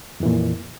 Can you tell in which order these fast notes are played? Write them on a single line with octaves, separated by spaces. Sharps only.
F2 E3 A#2